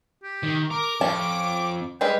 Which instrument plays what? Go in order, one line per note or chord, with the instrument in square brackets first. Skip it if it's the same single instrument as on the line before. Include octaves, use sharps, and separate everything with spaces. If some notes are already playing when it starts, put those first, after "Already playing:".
[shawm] G4
[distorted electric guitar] D#3
[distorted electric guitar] A#4 [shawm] D6
[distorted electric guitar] F2 [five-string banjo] C#4 A5
[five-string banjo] G3 G#3 B4 [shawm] G5